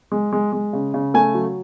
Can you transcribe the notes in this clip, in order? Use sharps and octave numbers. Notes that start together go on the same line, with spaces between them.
G#3
G#3
G#3
C#3
C#3
A3 G#5
F#3